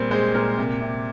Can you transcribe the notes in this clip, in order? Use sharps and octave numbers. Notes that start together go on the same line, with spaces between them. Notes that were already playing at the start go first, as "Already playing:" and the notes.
Already playing: A#2 G3 C4
G#3 C5
A#2 A#4
C3
C3